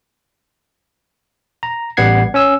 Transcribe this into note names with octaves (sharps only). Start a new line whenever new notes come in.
A#5
A1 G3 B3 F#5 G#6 C7
C#4 G#5 E6